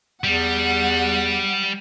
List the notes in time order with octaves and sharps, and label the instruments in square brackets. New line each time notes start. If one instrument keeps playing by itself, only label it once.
[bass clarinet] E2 [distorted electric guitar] G3 [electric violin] F#5